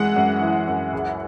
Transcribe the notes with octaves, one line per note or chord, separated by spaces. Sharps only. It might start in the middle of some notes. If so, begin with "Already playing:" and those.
Already playing: F#2 E3 G#3 F#5
F#2
E3
F#2
C#2